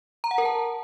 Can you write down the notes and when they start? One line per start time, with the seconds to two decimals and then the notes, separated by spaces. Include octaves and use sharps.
0.24 A#5
0.31 F#5
0.38 A#4
0.45 A5